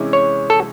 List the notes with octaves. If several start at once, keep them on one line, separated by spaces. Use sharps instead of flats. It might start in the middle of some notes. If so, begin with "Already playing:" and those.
Already playing: C3 E3 G#3 C#4 E4
C#5
A4